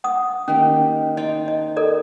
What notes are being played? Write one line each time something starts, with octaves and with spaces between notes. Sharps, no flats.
F#5 D#6
D#3 A#3 C#4 G4
D#4 C5 D#5 G5
D#5
A4 A#4 D5